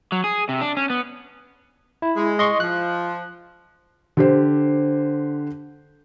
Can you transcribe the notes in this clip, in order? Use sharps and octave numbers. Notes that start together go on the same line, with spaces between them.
F#3
G#4
C3
D4
C#4
B3
E4
G#3
D#5 C6 C#6
F3 F#6
D3 G4 C5